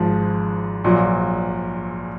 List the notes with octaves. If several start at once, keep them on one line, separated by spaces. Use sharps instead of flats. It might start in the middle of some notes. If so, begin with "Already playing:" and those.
Already playing: G#1 G#2 F3
A#1 A#2 F#3